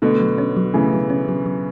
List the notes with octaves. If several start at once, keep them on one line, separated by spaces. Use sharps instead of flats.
B2 D3 A3
F#3
C#4
F#3
C#3 E3 A3
F#3
C#4
F#3
F#3